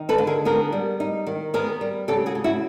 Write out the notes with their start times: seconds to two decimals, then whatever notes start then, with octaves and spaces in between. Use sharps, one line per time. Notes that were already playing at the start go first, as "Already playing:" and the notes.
Already playing: D#3 D#4
0.09 A4 B4
0.18 D3
0.27 G#4 A#4
0.45 B3 G#4 A#4
0.72 G3
1.00 D#4
1.27 D#3
1.54 B3 G#4 A#4
1.81 G3
2.08 C#3 G4 A4
2.26 F#4 G#4
2.35 C#3
2.44 E4 F#4